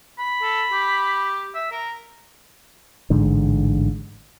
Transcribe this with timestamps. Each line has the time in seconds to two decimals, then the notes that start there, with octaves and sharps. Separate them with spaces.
0.19 B5
0.42 A4
0.72 G4
1.55 E5
1.72 A#4
3.10 A1 G#2 D3